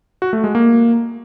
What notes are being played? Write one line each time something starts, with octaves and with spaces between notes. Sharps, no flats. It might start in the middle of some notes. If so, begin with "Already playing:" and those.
F#4
A3
G#3
A#3